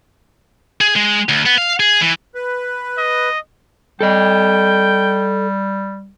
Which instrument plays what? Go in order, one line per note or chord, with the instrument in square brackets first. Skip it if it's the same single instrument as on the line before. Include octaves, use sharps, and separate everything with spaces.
[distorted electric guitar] G#4
G#3
D2
B3
F5
G#4
E3
[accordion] B4
[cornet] D#5
[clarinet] G3 [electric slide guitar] A4 D#5 [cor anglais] G5